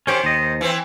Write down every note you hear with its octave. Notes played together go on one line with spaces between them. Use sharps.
D#3 C#4 G4 C5
D#2 D#5
E3 C4